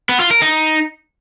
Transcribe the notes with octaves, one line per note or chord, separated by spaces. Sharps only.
B3
F4
A#4
D#4